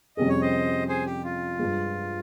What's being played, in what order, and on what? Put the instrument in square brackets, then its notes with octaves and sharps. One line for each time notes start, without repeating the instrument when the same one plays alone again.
[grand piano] F2 C3 G3 C#4 G#4 [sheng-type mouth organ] D#5
[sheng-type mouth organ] C#5
C5 D#5
G#4 C5
G4
F4
[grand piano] G2 F3 G#3